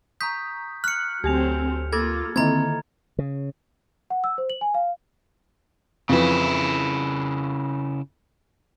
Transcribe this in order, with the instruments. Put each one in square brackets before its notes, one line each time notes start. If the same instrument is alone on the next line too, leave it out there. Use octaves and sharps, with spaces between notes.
[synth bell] A#5 C#6 D#6 [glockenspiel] G6 B6
[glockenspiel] F6 C#7 [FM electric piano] F#6
[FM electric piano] D2 [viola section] F#3 A3 C4 [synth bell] G4 G#5 F7
[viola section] A#3 F4 [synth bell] A4 D6 E6 [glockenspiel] G#6 A6
[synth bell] D3 D#3 A#3 [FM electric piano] C4 [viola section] A4 [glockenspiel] A#5 G#6
[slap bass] C#3
[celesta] F#5
E6
C5
F#7
G#5
F5
[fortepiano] F2 E3 [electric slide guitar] C#3 E4